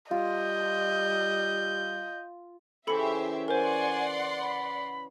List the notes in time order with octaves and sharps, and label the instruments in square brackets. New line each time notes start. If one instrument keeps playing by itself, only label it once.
[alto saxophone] G3 [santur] F4 [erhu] D#5 [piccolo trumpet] G6
[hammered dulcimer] C#3 E3 [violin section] G4 C5 E5 [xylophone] A4 B5 C#7
[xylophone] A#4 C5 [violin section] D5 F#5 C6 [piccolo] G#5
[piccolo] B5